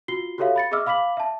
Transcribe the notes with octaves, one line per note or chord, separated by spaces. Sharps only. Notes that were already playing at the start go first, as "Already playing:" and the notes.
F4 F#4 C7 G7
F#4 G4 A4 C#5 E5 F5
B5 A6 C#7
G#4 D#5 E5 D6 E6 F6
F5 B5 D6 B6 F#7
E5 A5